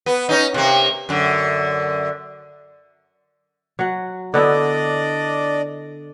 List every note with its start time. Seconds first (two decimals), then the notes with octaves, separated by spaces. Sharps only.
0.06 B3
0.29 C#4 D#4
0.54 C3 A#3
1.09 F#2 D3
3.79 F#3 F#5
4.34 D3 B3 D4 E4 D5 D#5